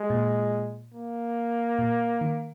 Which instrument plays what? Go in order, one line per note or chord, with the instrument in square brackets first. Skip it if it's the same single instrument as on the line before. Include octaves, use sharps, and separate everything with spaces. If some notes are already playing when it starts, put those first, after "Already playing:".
Already playing: [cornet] G#3
[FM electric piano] A#2
[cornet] A#3
[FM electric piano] A#2
D#3